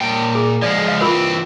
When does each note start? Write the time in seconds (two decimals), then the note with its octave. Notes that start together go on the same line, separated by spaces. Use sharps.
0.01 A#2 G5
0.35 G#4
0.62 F3 G#3 D5
0.88 F5
1.01 E3 C4 F4 A#4